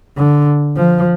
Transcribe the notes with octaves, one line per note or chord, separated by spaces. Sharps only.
D3
F3